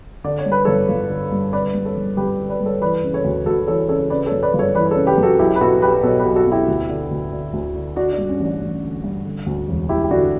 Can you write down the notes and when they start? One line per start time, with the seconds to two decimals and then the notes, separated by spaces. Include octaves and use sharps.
0.24 D3 D5
0.38 C#5
0.46 G2
0.52 B4
0.65 G1 A4 C#5
0.89 G1
1.10 D3
1.32 G2
1.53 D3 B4 D5
1.74 G2
1.85 A4 C#5
1.96 G1
2.17 G1 G4 B4
2.39 D3
2.50 B4 D5
2.60 G2
2.66 A4 C#5
2.82 E3 B4 D5
3.03 C#3
3.14 A4 C#5
3.24 D2
3.46 D2 F#4 A4
3.67 E3 A4 C#5
3.89 C#3 A4 C#5
4.10 C#3 B4 D5
4.26 A4 C#5
4.32 F#2
4.43 B4 D5
4.54 G1
4.59 A4 C#5
4.75 E3 B4 D5
4.91 C#3 A4 C#5
5.07 G4 B4
5.18 F#2
5.23 F#4 A4
5.39 B1 E4 G4
5.56 B4
5.61 B2 F#4 A4
5.82 B1 G4 B4
6.03 B2 A4 C#5
6.19 G4 B4
6.25 B1
6.36 F#4 A4
6.46 B2
6.52 E4 G4
6.68 D2
6.89 D3
7.11 D2
7.32 D3
7.53 D2
7.75 D3
7.96 D3 D4 F#4
8.13 D4
8.18 G2
8.29 C#4
8.40 A1
8.45 D4
8.61 A1
8.82 D3
9.04 G2
9.25 D3
9.46 D2
9.68 E1
9.89 E1 E4 G4
10.04 G4
10.11 D3 D4 F#4